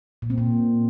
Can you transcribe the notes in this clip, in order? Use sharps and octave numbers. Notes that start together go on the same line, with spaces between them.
A#2
C4
A#2